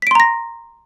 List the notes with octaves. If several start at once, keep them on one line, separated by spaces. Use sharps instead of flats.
A#5 C6 A#6 B6 D7